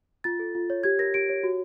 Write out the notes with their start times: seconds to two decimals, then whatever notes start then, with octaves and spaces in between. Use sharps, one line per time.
0.24 F4 A6
0.39 A4
0.55 F4
0.70 C#5
0.84 G4 G#6
0.99 A#4 A#6
1.14 G4 D7
1.29 C#5
1.43 F#4